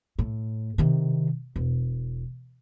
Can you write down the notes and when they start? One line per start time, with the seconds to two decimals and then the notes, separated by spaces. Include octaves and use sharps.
0.19 A2
0.78 C3 D#3
1.56 E1